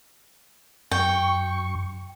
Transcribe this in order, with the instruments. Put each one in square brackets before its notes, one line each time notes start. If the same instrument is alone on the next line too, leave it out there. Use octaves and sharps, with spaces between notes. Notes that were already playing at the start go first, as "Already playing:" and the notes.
[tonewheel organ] F#2 C#6 [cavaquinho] G5